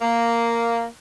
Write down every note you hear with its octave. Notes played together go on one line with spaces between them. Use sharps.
A#3